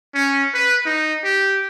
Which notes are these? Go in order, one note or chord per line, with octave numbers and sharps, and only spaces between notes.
C#4
B4
D#4
G4